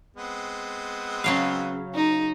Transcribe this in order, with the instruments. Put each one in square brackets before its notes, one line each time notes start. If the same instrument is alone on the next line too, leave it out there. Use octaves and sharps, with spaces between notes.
[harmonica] G#3 B3 C4
[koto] C#3 F#3 F5
[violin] D#4 [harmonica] A#4